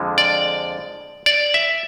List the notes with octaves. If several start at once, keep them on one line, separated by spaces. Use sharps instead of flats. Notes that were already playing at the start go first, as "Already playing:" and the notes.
Already playing: F2 D3 F3 G#3
D5
D5
E5